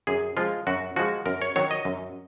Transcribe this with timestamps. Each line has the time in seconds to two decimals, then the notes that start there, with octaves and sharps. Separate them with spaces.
0.07 F#2 G#4
0.37 F3 G#3 F4
0.67 F#2 F#4
0.96 F3 G#3 F#4
1.26 F#2 A#4
1.42 C#5
1.56 D#3 F#3 C#5
1.71 D#5
1.85 F#2